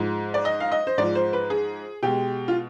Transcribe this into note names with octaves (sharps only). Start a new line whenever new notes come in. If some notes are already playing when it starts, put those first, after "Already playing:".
Already playing: G#2 F3 G#3
D5
D#5
F5
D#5
C5
G#2 F3 G#3 D5
C5
B4
G#4
B2 G#3 G4
F4